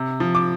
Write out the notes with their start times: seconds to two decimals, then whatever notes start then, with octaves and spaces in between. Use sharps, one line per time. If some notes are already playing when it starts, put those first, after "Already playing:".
Already playing: C3
0.20 F3
0.35 D6